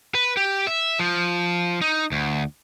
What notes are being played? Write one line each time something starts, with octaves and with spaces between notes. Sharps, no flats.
B4
G4
E5
F3
D#4
D2